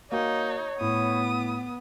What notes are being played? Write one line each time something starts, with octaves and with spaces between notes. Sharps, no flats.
A#3 D#4 F#4 C#5 G5
A2 B3 D#6